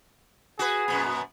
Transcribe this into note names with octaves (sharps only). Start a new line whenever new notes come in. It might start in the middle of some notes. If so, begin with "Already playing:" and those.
F#4 G#4 B4
F#2 A#2 B3